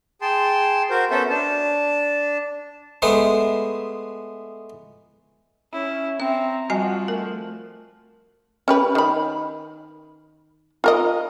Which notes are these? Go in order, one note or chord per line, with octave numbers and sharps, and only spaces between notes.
G#4 G5 A5 C6
F#4 A#4 C5
B3 C#4 A4 C5 E5
D4 A5
G#3 A3 B3 C5
C#4 E4
C4 E5 A#5
F3 G3 F#4 D#5 G#5
A3 A#4
C#4 G4 B4
D#3 B5
F4 A#4 D#5